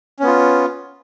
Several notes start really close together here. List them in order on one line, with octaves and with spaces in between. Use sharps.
C#4 B3 F4